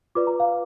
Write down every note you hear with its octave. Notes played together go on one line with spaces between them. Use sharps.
F4 B4 D5 D6
A#5
F5